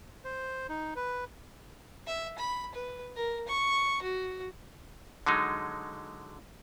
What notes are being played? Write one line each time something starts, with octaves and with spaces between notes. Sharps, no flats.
C5
D#4
B4
E5
B5
B4
A#4
C#6
F#4
D3 F#3 G#3 D#4